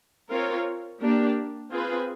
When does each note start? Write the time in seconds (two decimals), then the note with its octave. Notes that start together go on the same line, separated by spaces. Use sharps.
0.30 C4 F4 A#4 C#5
1.00 A#3 D4 G4
1.70 C4 F4 G#4 B4